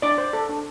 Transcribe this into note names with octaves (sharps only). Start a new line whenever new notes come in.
D4 D5 D6
C5
A4
D4